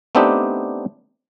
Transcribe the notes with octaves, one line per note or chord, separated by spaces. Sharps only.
A3 B3 C4 D4 D#4 G4